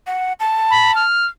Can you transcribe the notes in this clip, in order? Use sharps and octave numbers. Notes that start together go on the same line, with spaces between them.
F#5
A5
B5
F6